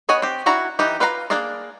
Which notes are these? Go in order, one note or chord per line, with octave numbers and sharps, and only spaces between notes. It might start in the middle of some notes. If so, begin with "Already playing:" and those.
B3 C#5 D#5 F#5 G#5
C4 G4
D4 E4 F#4 A#5
E3 D#4 G4
F4 B4 F5 F#5 A#5
A#3 D4 G#4 A#4 D5